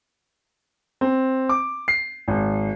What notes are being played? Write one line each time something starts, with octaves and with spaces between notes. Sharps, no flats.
C4
D6
C7
G#1